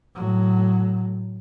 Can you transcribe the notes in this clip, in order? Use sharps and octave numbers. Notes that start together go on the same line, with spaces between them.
A2 F#3